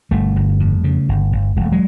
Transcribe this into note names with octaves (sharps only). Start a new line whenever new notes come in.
G1 G3 A3
G1
F2
C#3
G1
G1
E1 G#3
A3
F#3 G#3